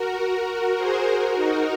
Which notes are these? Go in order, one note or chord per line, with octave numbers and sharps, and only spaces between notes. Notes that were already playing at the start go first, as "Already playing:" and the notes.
Already playing: F#4 A#4
F#4 A#4
G#4 C5
F#4 A#4
D#4 F#4